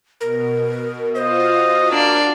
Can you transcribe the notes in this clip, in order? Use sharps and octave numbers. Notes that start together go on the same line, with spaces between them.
B2 A#4
F4 F#4 C5 D#5 F5
A#3 D4 D5